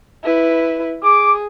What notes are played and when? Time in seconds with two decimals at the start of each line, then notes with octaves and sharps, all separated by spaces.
0.24 E4 B4
1.03 G#4 D6